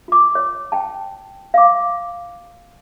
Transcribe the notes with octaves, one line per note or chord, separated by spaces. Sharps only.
F4 D6
C#5
G5 A5
F5 D6